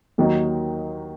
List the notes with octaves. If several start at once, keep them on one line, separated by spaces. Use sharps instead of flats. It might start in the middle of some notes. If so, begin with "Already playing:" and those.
D#2 D#3 F#3 D#4